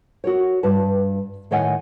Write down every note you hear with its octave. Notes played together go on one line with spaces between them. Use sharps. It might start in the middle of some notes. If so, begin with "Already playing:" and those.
F#4 A#4 C#5
G2 B4 A5
A2 D#3 C#5 D#5 F#5 G#5